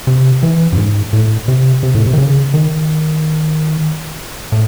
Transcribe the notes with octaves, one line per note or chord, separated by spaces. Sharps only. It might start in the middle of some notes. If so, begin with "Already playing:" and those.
C3
E3
F#2
G#2
A2
C3
C3
A2
C3
D#3
C#3
D#3
A2